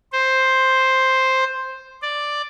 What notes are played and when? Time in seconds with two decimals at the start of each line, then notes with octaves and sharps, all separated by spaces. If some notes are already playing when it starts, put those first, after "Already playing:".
0.13 C5
2.02 D5